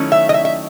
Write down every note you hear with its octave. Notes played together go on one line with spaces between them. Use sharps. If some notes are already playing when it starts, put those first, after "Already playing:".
Already playing: D#3 F#3 A3 C#4 E4
E5
D#5
E5
E5